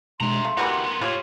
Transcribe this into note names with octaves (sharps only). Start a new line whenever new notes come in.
B2 G#3 D4 E5 A#5 C6
A3 A4 F5
E3 G3 A#3 B3 F#4 A#5
A2 F4 G4 C#5